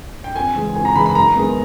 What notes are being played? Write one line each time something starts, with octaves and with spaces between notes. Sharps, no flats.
G5
F2 G#5
C#3 E3 G#3
F2 G#5
A#5
C#3 E3 G#3 B5
B5
F#2 A#5
D#3 G#3 B3